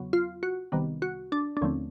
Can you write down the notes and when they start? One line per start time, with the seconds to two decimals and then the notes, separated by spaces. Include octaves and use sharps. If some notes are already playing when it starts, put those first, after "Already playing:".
Already playing: E2 C#3 F#3 B3
0.13 F4
0.43 F#4
0.72 C2 C3 D#3 G3 B3
1.02 F#4
1.32 D4
1.57 D4
1.61 D#2 D3 F3 A3 C4 C#4